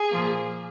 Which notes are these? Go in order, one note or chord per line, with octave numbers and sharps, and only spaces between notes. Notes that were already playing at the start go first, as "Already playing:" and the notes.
Already playing: G#4
A#2 F3 A#3